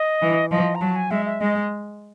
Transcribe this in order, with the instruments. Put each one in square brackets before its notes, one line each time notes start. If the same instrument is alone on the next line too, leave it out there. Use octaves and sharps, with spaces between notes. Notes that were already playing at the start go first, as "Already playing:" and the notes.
Already playing: [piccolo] D#5
[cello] E3
[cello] F3 [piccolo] D#5
[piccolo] A#5
[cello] F#3 [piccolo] A5
[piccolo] G#5
[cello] G#3 [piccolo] E5
[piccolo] E5
[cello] G#3 [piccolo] D#5